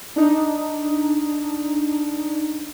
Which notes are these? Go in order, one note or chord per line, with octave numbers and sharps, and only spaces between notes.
D4 D#4